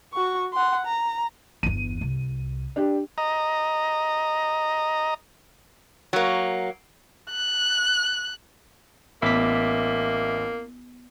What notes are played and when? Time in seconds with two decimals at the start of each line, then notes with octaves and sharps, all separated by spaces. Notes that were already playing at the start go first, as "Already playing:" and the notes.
0.13 F#4 C#6
0.53 F#5 C6
0.85 A#5
1.63 G1 E2 D#7
2.01 C2
2.76 D4 G4
3.18 D#5 A#5
6.13 F#3 A#3
7.31 F#6
9.22 A1 A#3 B3 E5 D6 B6